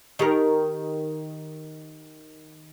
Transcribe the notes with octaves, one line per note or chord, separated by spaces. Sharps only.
D#3 G4 A#4